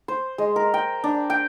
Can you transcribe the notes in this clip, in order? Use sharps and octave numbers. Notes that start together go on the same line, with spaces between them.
C5
G#3
A#4
G5
D4
G5